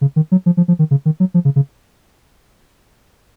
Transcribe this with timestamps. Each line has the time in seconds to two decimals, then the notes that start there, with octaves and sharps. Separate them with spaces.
0.01 C#3
0.16 D#3
0.32 F#3
0.46 F3
0.57 F3
0.68 F3
0.79 D#3
0.91 C#3
1.05 D#3
1.20 F#3
1.34 F3
1.45 C#3
1.56 C#3